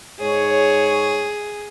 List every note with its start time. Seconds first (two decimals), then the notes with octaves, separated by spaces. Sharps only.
0.20 G#2 G#4 C#5